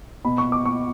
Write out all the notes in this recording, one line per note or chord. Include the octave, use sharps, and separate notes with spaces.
B2 B5
C#6
D6
C#6